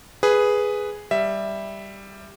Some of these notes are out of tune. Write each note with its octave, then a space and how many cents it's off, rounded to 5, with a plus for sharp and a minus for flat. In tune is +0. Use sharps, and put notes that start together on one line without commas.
G#4 +0 B4 +0
G3 +5 E5 +0